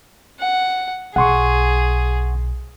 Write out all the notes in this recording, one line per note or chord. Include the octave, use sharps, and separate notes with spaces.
F#5
B1 G#4 F#5 C6 C#6